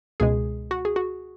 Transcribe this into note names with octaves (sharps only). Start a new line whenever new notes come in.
C#2 B2 G#3 G#4
F#4
G#4
F#4